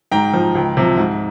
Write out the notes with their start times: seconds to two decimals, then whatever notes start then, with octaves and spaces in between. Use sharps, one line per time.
0.12 G#2 G5 A#5
0.34 F3
0.55 C#2
0.77 C3 F3
0.97 G#2